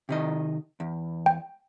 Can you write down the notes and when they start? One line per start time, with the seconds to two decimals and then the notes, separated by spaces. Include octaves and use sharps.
0.09 C3 D#3 D#5
0.80 E2
1.26 G5